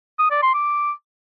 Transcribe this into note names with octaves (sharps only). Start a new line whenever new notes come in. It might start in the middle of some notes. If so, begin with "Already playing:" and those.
D#6
D5
C6
D6